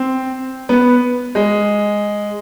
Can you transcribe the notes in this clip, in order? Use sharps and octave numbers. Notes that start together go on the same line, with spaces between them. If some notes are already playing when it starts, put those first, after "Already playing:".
Already playing: C4
B3
G#3